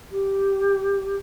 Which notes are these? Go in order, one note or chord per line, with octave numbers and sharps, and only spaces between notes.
G4